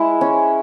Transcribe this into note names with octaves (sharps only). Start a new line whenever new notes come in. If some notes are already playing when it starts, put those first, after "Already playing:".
Already playing: G#3 E4
C#4